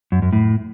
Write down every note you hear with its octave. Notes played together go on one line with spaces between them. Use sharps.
F#2
F#2
A2